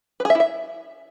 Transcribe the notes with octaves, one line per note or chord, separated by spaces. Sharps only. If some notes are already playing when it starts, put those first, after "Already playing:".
B4
G#4
E5
E4
E5